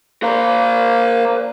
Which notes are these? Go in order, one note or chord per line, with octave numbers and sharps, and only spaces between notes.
A#3 A#4 C5